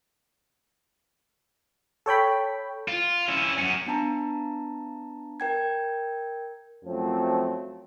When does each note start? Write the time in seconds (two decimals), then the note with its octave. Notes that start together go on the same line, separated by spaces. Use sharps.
2.06 A4 C#5 G5 B5
2.88 F4
3.29 C#4 E4
3.59 F#3 C#4
3.87 B3 D4 A5 A#5
5.40 A#4 G5 G#6
6.85 F#2 F3 F#3 A3 C4